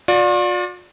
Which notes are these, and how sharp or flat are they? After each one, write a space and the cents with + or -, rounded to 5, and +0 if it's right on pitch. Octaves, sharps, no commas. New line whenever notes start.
F4 +45 D5 +0